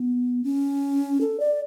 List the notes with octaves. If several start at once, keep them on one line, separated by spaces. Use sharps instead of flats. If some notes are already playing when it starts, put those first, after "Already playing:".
Already playing: B3
C#4
A4
D5